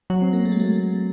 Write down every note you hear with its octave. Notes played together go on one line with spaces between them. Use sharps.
F#3 F#4
C4
A#3
A3
G#3
A3